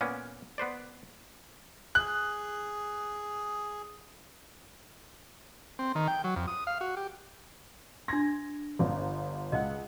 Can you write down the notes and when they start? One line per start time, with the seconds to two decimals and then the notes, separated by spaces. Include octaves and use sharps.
0.01 A#2 A#3 B3 C#4
0.58 B3 B4 C5 D5
1.95 G#4 F#6
5.79 C4
5.95 D#3
6.08 G5
6.24 F#3
6.36 F2
6.48 D#6
6.67 F5
6.81 F#4
6.97 G4
8.08 D4 C6 G#6 A#6
8.79 G1 D3
9.52 C#2 D#5 F#5